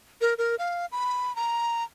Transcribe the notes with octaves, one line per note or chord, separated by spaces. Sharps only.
A#4
A#4
F5
B5
A#5